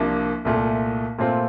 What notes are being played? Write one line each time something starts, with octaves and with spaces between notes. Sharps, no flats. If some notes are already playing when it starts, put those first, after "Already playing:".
Already playing: C2 C3 F3 A#3 D4
C2 A#2 A3
A#2 A3 C4 F4